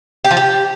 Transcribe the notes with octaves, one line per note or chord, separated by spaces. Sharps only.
G4
F3
G4